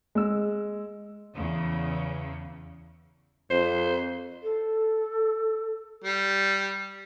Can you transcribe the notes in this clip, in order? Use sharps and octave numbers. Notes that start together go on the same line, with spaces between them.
G#3 E6
E2 C#3
F2 C5
A4
G3